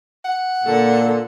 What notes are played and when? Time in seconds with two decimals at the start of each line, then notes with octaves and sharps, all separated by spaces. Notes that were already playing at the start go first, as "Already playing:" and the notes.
0.24 F#5
0.63 A#2 D3 A4